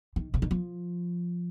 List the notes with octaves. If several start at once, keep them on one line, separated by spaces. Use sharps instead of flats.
D#3
C#3
D#3
F3